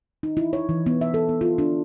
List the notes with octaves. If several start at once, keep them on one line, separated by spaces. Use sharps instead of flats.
D#4
E4
C#5
E3
B3
E5
A4
B3
F4
D4